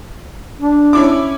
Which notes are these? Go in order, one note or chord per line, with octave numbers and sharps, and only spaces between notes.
D4
C#4 E4 D6